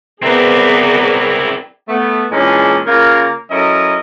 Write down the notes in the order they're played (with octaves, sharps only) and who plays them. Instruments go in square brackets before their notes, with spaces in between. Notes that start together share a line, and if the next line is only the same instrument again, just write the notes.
[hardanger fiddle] B3 B4 [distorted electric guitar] C4 E4 [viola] G#4 D5 [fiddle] A#4
[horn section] A3 B3
A#2 E3 G#3 C#4 D4 G#4
C#3 A#3 F4 A#4
F#3 C#4 E4 A4 A#4 D#5